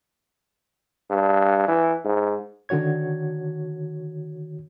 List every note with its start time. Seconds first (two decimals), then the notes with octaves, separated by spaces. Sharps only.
1.10 G2
1.68 E3
2.05 G#2
2.69 D3 D#3 F#4 C#5 G#6